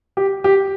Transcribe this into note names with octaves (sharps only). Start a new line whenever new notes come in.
G4
G4